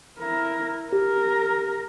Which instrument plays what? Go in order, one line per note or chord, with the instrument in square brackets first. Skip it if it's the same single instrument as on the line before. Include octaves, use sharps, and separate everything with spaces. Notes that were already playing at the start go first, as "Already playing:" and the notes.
[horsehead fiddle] E4 A#4
[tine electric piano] G4 [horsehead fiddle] A#4